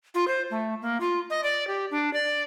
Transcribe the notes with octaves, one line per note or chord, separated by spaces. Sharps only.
F4
C5
A3
A#3
F4
D#5
D5
G4
D4
D5